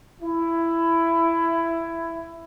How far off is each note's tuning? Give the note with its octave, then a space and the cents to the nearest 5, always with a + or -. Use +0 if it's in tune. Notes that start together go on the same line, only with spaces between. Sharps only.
E4 +15